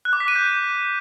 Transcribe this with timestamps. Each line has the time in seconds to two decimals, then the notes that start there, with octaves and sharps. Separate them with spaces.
0.05 F#6
0.13 D6
0.20 B6
0.28 D#7
0.36 G6